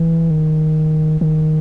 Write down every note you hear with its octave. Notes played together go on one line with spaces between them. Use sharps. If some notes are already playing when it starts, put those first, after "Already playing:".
Already playing: E3
D#3
D#3